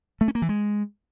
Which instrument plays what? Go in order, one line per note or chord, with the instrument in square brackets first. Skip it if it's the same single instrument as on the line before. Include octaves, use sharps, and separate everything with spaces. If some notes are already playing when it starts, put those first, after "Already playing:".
[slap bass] A3
C#4
A#3
E3
G#3